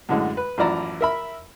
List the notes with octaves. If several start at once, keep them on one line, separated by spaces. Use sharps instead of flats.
F#2 A2 D3 G#3
B4
A1 F#2 F3 E4 D5 A#5
A#4 E5 B5